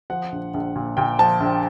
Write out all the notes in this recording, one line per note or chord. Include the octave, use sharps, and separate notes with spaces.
F3 F#5
A#1
A#1
A#2
A#2 G5
F3 A5
A#1